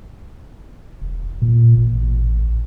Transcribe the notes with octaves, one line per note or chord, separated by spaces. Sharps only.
E1
A#2
A1